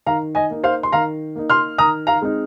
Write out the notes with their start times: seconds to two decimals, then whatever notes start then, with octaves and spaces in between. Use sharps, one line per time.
0.07 D#3 F5 A#5
0.35 D#5 G#5
0.50 A#3 D#4
0.64 C5 F5
0.83 C6
0.92 D#3 F5 A#5
1.36 A#3 D#4
1.50 C6 F6
1.78 D#3 A#5 D#6
2.07 F5 A#5
2.22 G#3 C4 D#4